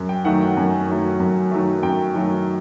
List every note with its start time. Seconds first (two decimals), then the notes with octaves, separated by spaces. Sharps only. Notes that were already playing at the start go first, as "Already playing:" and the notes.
Already playing: F#2
0.09 G5
0.25 D#3 F#3 A3 F#5
0.41 G5
0.57 F#2 G#5
0.88 D#3 F#3 A3
1.20 F#2
1.51 D#3 F#3 A3
1.83 F#2 G5
2.14 D#3 F#3 A3